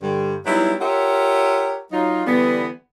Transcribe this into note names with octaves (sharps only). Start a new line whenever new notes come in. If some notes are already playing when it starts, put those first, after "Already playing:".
G2 D3 G3
F#3 G3 B3 D#4 E4
F4 G4 A#4 C#5 E5 F#5
F#3 D#4 F4
D3 E3 G3 B3